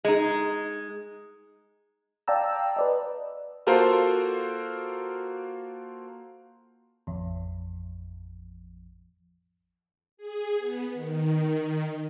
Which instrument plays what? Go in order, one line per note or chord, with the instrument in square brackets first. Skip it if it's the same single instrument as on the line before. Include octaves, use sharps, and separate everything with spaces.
[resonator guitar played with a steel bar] G#3 D#4
[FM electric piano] D5 F5 G5 A5 A#5 E6
B4 D5 D#5
[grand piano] A#3 F4 F#4 A4 A#4 C5
[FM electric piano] A1 F2
[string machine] G#4
B3
D#3